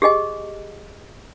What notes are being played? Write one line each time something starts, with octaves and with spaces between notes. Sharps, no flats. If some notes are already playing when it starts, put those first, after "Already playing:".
G4 G#4 D#5 G#5